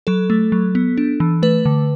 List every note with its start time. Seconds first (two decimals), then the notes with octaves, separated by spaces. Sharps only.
0.07 F#3 A4
0.30 A3
0.52 F#3
0.75 B3
0.98 D4
1.20 E3
1.42 A3 B4
1.65 D3